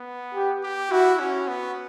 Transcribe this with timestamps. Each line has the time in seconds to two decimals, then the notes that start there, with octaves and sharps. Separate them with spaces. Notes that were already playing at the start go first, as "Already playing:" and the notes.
Already playing: B3
0.35 G4
0.63 G4
0.91 E4 F#4
1.20 C#4
1.48 B3